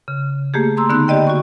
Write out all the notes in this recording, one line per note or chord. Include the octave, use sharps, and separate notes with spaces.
C#3
A3 A#3 G4 G#4
A#5 C6 E6
D3 B3 D#4 F#6
G4 D5 D#5 G5
F#4 C#6